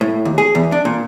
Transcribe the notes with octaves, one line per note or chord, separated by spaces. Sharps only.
A2
D#2
G#4
E2
D4
A#2